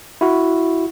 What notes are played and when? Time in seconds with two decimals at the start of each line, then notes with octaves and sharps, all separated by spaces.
0.21 E4 F#4